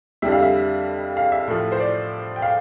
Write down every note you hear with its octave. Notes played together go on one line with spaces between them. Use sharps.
F2 D3 G3 E5
F5
E5
F5
E5
A2 F3
C5
D5
G5
F5